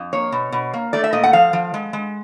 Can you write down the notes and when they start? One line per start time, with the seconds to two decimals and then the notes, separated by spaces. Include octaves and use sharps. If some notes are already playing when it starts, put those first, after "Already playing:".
Already playing: F2
0.13 A#3 C#5
0.32 B2
0.52 B2
0.74 A#3
0.93 A3 D5
1.04 E5
1.13 A#2 D#5
1.23 F#5
1.33 F3 F5
1.53 F3
1.74 G#3
1.93 G#3